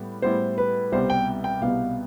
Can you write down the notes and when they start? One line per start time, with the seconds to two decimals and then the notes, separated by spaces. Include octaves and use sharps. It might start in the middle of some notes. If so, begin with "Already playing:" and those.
Already playing: A2 G3 B3
0.22 A2 G3 B3 E4 C5
0.58 B4
0.92 C2 B2 G3 B3 C5
1.10 G5
1.44 G5
1.61 C2 B2 G3 B3 F5